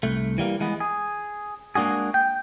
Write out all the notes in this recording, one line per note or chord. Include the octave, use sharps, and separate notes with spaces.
C2 A3
E3 G3 A#3
E3 G#3 B3
G#4
G#3 A#3 D4 F#4 G#4
G5